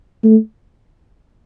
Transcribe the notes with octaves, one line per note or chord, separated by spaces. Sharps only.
A3